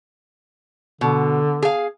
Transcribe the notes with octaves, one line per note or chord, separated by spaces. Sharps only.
B2 D3
G#4 F5